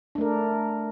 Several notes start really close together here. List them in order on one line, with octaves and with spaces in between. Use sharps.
D4 A3 A#4